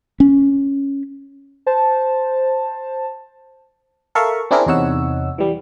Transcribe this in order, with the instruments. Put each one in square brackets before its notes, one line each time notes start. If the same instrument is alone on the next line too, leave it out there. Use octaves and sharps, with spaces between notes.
[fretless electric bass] C#4
[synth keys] C5 A5
[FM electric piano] A4 A#4 E5 F5 C#6
C4 D4 E4 G#4 A#4
E2 C3 D#4 C#5 F#5 E6
E3 G3